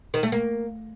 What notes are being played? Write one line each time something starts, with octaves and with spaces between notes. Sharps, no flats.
D#3
A3
A#3